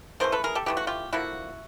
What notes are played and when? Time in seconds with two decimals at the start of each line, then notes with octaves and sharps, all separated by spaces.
0.20 C#3 E3 A3 A#4 C5
0.32 A4 B4
0.44 G#4 A#4
0.55 G4 A4
0.66 C#3 E3 A3 G4
0.77 F#4
0.87 F4 G4
1.13 D3 F3 A#3 E4 F#4